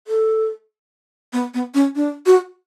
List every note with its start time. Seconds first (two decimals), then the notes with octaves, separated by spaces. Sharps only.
0.08 A4
1.33 B3
1.54 B3
1.74 C#4
1.96 D4
2.26 F#4